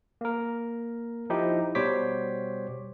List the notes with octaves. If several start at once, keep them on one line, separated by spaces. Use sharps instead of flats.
A#3 A#4
F3 D#4 E4 G4
B2 G3 C5 C#5 D6 B6